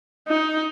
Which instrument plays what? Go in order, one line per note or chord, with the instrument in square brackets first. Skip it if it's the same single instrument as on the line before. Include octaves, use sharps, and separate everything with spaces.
[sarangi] D#4